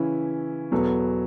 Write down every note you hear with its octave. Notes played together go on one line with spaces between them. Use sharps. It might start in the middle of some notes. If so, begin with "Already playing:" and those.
Already playing: C#3 E3 C#4 E4
E2 B2 F#3 B3 A4